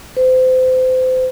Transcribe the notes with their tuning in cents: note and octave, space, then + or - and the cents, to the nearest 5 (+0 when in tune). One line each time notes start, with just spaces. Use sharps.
C5 -30